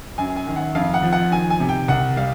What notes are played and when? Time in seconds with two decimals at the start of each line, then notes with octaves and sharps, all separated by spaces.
0.18 F#2 G#5
0.36 G#5
0.47 D#3
0.56 F#5
0.75 F2 F5
0.94 F#5
1.03 F3
1.13 F#5
1.31 D#3 G#5
1.50 G#5
1.60 C3
1.69 G5
1.88 C2 F#5
2.16 G3 F5